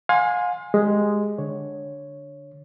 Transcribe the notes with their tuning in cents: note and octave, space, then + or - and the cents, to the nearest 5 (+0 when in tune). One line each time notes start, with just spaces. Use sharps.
F5 +40 G#5 -5 C6 +0
G#3 +0 G4 +0
D3 +0 C#5 +0